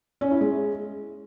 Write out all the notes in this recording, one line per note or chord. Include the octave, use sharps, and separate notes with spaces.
C#4
E4
G#3